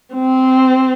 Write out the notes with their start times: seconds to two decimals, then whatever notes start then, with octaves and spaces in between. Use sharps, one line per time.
0.14 C4